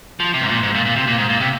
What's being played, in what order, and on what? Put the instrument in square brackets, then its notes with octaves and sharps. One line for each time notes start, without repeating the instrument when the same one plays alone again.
[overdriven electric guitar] F3
C3
G#2
A#2
G#2
A#2
A#2
C3
A#2
G#2
A#2
C3